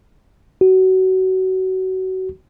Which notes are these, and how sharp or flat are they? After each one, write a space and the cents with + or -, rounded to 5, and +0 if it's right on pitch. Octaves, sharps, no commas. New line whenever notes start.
F#4 +25